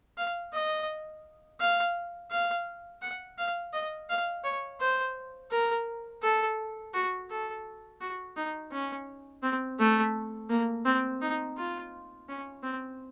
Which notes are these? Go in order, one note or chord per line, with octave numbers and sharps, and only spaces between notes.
F5
D#5
F5
F5
F#5
F5
D#5
F5
C#5
C5
A#4
A4
F#4
A4
F#4
D#4
C#4
C4
A3
A#3
C4
D#4
F4
C#4
C4